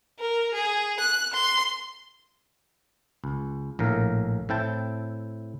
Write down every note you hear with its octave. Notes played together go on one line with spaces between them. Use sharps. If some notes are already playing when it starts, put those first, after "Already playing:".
A#4
G#4
F#6
C6
C#2
A#1 A2 A#4
A2 C4 E4 G5 A5